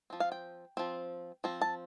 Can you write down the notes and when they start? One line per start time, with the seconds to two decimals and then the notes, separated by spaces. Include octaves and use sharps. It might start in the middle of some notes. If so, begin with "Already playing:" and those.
0.10 F3 C4
0.20 F5
0.32 G5
0.77 F3 C4
1.44 F3 C4
1.61 A5